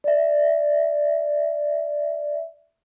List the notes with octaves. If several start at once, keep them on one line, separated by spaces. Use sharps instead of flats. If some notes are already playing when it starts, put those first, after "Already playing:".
D5 E5